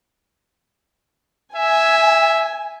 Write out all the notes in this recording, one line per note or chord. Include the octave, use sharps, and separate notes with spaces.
E5 G#5